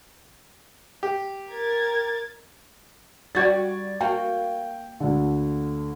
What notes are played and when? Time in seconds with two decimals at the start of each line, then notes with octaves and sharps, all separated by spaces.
1.03 G4
1.52 A#4 G#6 A6
3.35 G3 F#4 D5 G#6 A6
4.01 A#3 F#4 G5
5.00 D2 D3